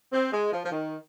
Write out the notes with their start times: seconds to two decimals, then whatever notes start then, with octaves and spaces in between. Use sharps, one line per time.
0.12 C4
0.32 G#3
0.52 F3
0.64 F3
0.71 D#3